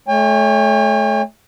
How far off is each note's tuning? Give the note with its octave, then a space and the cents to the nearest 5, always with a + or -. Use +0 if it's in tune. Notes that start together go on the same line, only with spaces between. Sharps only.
A3 -30 C#5 +10 G5 +45